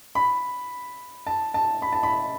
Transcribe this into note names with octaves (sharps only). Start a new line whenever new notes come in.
B5
A5
A5
B5
A5
B5